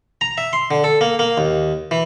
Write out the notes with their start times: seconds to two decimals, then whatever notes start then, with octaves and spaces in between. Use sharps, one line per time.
0.21 A#5
0.38 E5
0.53 C6
0.71 D3
0.84 A4
1.01 A#3
1.19 A#3
1.38 D#2
1.91 E3